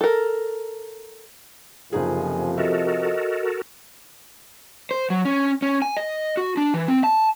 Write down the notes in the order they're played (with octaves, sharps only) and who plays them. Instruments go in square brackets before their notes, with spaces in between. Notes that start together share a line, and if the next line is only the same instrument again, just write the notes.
[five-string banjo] A4 A#4
[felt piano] F#1 D#4 G#4 [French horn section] F2 C3 F3 [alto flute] G#5
[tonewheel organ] F#4 A4 A#4 [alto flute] D#5 [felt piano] E5
[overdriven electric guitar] C5
F#3
C#4
C#4
G#5
D#5
F#4
D4
E3
C4
A5